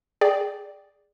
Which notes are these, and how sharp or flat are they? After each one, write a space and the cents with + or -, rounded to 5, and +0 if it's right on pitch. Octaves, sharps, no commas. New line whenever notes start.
G#4 -5 D5 +0 G5 -5